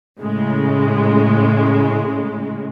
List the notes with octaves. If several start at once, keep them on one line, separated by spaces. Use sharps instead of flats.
A2 C#3 G#3